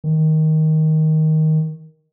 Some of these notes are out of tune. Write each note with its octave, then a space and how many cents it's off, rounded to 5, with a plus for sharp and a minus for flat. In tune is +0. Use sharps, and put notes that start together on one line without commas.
D#3 +10